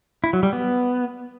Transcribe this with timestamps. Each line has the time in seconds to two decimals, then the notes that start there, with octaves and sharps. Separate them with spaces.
0.24 E4
0.33 F#3
0.43 G3
0.53 B3